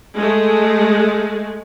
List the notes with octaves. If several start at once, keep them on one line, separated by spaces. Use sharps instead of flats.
G#3 A3